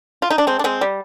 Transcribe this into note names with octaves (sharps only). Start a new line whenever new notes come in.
F4
D#4
D4
G#3 C4
D4
G#3 C4
G3